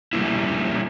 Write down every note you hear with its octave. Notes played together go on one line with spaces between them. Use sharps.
F3 G3 A3 A#3 C#4 E4